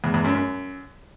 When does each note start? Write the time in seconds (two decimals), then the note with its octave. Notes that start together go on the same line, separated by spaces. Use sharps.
0.04 E2
0.14 E2
0.24 F#2
0.35 F#2